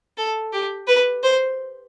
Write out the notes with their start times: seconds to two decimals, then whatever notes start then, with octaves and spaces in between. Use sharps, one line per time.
0.17 A4
0.53 G4
0.88 B4
1.23 C5